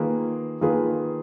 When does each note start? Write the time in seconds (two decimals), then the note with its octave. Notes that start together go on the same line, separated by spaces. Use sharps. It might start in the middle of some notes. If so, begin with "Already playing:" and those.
Already playing: D#3 A#3 F4 G#4 B4
0.61 D#3 A#3 F4 G#4 B4